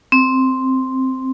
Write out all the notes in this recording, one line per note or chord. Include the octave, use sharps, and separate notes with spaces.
C4